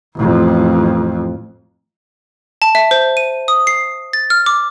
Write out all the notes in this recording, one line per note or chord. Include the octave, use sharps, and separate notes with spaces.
A1 F2
A5
E5
C5
D#7
D#6
C7
A6
F6
D6